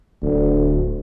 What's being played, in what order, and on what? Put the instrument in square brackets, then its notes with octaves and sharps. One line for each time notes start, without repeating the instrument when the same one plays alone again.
[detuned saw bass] D1 [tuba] D2